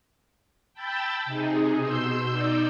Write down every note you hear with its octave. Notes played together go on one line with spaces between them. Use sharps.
G5 A5 B5 E6 G6 A6
C3 D#4 G#4
B2 C6 E6 G6
D#4 D5 E6 G6